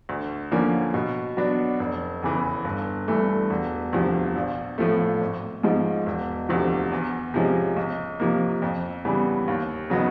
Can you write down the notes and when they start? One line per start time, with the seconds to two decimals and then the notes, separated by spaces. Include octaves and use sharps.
0.09 D2
0.52 D3 F3 A#3 C#4
0.94 B2
1.37 F#3 B3 D4
1.79 F1
2.22 E2 C#3 E3
2.65 G1
3.08 G2 E3 A3
3.50 E1
3.93 D2 C3 F3
4.35 A#1
4.78 A2 F3 A3
5.21 G#1
5.63 G#2 F3 G#3
6.06 E1
6.49 D2 C3 F3
6.92 E2
7.34 C3 F3 G#3 C#4
7.77 C#2
8.20 C3 F3 A#3
8.62 F2
9.05 C#3 E3 G3 B3
9.48 D#2
9.90 C#3 F#3 B3 D#4